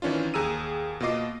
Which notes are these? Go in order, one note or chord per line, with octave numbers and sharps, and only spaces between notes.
D#3 E3 C#4 D4 F4
D#2 G#4 A#5 E6 D#7
B2 A#3 F4 D#5 D6 C7